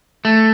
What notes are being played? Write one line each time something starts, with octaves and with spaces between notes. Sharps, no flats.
A3